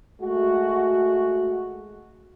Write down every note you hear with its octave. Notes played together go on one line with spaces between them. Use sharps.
G#3 A3 F#4